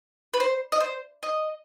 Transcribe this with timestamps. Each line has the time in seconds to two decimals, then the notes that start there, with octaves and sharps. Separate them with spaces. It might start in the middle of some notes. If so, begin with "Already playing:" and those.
0.34 B4
0.40 C5
0.72 D#5
0.80 C5
1.23 D#5